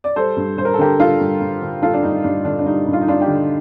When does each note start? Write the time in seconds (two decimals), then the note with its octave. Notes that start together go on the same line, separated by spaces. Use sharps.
0.04 D5
0.16 G3 A4 C5
0.36 G2
0.57 G2 C5
0.65 A#4
0.74 A4
0.78 D3 G4 A#4
0.99 G3 F4 A4
1.19 G2
1.40 G2
1.61 D3
1.82 G3 F4 A4
1.94 D4
2.03 G2 D#4
2.24 G2 D4
2.45 D3 D4
2.59 D4
2.66 G3 D#4
2.87 G2
2.93 F4
3.01 D#4
3.07 G2 D4 F4
3.20 D#4 G4
3.27 D3